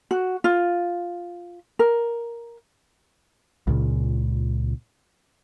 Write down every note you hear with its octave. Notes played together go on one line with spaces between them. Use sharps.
F#4
F4
A#4
C#2 A#2 C#3